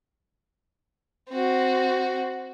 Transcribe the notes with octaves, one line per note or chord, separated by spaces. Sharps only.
C4 F#4